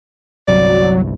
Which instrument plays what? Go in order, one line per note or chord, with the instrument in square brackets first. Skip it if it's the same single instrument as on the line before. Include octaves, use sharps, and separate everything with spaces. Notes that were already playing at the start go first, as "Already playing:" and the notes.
[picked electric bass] G1 C2 [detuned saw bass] F#3 [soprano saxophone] D5